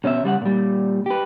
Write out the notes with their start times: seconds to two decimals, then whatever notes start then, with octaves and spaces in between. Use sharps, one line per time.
0.04 B2 C#4 B4 E5
0.24 C#3 G3 B4 F#5
0.42 A#2 G3
1.06 G4 B4